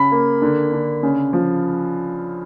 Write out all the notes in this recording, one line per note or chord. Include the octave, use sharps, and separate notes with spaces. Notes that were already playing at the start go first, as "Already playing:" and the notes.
Already playing: C#3 B5
A#3
D3
D3
C#3
F3